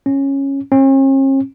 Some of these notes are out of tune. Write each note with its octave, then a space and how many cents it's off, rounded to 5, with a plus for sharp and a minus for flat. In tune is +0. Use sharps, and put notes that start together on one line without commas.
C#4 -10
C#4 -45